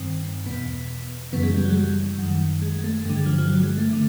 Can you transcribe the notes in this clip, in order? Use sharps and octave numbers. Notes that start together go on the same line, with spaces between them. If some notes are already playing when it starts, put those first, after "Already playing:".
Already playing: G2 D#3 C4
E2 B2 B3
F#2 C#3 E3 B3
G#3
G3
F#3
G#3
G3
F#2 D#3
G#3
G#3
A3
G2 D3 A3
G#3
F3
F3
F#3
G#3
A3
D3 A3